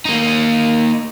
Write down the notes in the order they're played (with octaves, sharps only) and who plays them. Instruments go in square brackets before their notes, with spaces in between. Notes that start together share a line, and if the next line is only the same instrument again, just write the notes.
[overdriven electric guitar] A#3 D#4